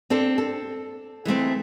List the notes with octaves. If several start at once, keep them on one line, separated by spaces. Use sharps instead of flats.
C4 D4 A4 C5
A4
E3 G#3 A3 C4